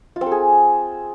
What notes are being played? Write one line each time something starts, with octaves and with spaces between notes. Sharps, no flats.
F4
C4
A4
G#4